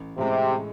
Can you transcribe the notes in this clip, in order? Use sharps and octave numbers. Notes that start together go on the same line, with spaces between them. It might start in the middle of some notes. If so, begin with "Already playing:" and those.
Already playing: A1
A2 C3 G#3